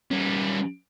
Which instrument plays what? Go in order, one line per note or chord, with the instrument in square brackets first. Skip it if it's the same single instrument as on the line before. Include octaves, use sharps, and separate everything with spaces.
[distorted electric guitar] G3 C#4